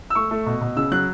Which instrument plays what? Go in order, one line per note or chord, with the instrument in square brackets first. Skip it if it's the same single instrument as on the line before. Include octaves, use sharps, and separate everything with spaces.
[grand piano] E6
A3 C#6
A3
B2
B2
C#3 E6
F#3 F#6